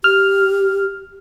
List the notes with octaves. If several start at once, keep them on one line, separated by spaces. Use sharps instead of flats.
G4 F6